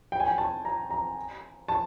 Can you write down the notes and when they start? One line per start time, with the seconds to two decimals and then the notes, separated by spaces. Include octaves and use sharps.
0.12 G5
0.20 G#5
0.28 G5
0.38 A5
0.65 A#5
0.91 A#5
1.68 A5